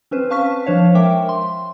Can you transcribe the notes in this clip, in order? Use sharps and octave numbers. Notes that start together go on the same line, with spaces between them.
C4 C#4 B4 C5
B4 F5 A5 C#6 F6 B6
F3 D4 C5 C#5 F5
G#3 A#4 E5 G5 D6
C6